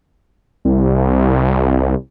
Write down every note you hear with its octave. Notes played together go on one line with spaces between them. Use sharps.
C2